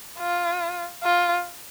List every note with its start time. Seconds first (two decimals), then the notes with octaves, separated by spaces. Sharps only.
0.19 F4
1.03 F4